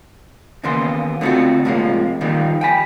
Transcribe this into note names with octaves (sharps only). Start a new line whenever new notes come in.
D#2 C#3 E3 A#3 B3 C6
D3 A3 C4 F4 F#4
A2 C3 F3 G#3 A#3
D#2 A#2 D#3 F3 G3 A#3
G5 G#5 B5